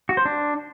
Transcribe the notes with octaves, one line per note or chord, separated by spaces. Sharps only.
F#4
C5
D4